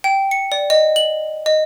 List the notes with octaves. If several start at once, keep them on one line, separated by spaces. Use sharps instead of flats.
G5
C#7
D5
D#5
F#7
D#5